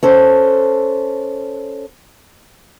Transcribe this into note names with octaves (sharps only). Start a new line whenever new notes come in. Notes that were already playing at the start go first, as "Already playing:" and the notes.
C#4 A4 C5